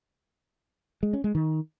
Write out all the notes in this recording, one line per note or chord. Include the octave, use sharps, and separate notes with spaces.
G#3
C#4
G#3
D#3